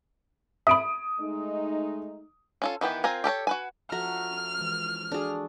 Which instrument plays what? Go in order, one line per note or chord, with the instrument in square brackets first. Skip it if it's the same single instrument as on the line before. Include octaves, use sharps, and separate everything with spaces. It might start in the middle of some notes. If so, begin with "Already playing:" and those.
[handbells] E5 B5 [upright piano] D#6 D7
[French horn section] G#3 A3 D#4
[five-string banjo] C#4 F4 A4
D#3 E3 B3 G4
C4 F4 A#4 G#5
G4 A4 A#4 C#5
F#4 B4 G#5
[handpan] F3 F#4 A4 [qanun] E5 F#5 A#5 [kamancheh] F6
[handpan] E3 G#3
[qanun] D4 G#4 [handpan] F#4 A4